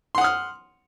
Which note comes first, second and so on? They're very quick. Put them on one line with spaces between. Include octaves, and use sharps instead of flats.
C6 F#5 D#6 F6